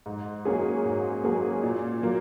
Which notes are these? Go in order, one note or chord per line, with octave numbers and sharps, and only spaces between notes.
G#2
F#3 A#3 C#4 G#4
G#2
F#3 A#3 C#4 G#4
A#2
F#3 A#3